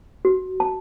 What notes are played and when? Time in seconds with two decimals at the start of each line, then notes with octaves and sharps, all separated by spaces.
0.25 F#4
0.60 A5